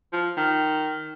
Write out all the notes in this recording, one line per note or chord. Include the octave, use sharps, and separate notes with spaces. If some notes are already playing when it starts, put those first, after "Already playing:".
F3
D#3